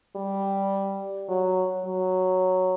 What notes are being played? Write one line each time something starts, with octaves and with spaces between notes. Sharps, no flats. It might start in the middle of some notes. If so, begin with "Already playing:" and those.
G3
F#3
F#3